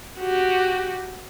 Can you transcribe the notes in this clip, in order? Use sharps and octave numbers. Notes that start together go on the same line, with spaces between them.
F#4 G4